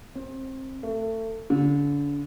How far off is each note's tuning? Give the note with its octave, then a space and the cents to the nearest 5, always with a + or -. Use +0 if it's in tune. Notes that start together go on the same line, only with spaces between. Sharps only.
C4 +25
A3 +25
D3 -35